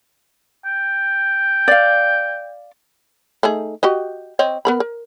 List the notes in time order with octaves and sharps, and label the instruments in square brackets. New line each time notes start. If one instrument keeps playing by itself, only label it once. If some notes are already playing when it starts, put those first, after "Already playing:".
[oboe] G5
[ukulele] D5 F5
[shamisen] A3 D#4 G#4
F#4 G4 D#5
C4 C#5 D#5
B3 A#4 B5
A#4